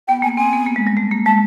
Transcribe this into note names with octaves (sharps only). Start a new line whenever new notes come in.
B3 G5
A#3 G#5
C4 G#5
B3
A#3
G#3
G3
A3
A#3
G#3 A5